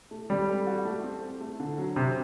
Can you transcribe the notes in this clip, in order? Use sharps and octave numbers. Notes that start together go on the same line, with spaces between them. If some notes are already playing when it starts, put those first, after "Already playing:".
A3
G3 C4
A4
F#4
A3
C4
A4
A3
D3
F#3
C3 C4